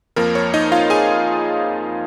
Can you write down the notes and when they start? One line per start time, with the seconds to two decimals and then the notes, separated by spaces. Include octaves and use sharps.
0.16 F2 F3 A#3 A#4
0.35 C#5
0.54 D#4 D#5
0.72 F4 F5
0.90 G#4 G#5